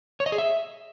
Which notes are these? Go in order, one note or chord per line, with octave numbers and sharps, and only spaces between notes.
C#5
D#5
G#4
E5